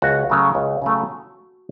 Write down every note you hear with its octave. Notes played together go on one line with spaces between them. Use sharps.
C#2 F#4
C#3 F#3 A3
C#2
C#3 F#3 A3